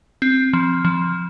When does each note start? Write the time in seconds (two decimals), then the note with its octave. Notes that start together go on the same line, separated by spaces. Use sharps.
0.22 C4
0.53 F3
0.85 F3